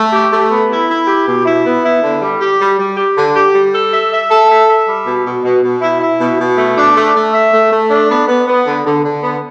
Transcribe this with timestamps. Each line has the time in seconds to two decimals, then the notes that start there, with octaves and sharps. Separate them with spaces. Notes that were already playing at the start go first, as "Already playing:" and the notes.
Already playing: A3
0.13 G4
0.32 A3
0.51 B3
0.70 E4
0.89 E4
1.08 G4
1.27 B2
1.45 E4
1.65 B3
1.84 E4
2.03 D3
2.22 G3
2.41 G4
2.60 G3
2.79 G3
2.97 G4
3.16 D3
3.36 G4
3.55 G3
3.73 A4
3.92 E5
4.12 E5
4.31 A4
4.49 E5
4.68 E5
4.87 G3
5.06 B2
5.25 B2
5.44 B2
5.63 B2
5.82 E4
6.01 E4
6.20 B2
6.39 B2
6.57 A3
6.77 D4
6.96 A3
7.15 A3
7.34 E5
7.52 A3
7.72 A3
7.90 D4
8.10 B3
8.28 B3
8.47 B3
8.66 D3
8.85 D3
9.04 D3
9.23 B3